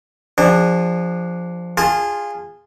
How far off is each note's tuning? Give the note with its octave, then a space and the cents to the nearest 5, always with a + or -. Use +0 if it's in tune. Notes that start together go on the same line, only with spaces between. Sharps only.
F3 +0 D4 +0 G#4 -35
F4 +0 G#4 -20 A5 -35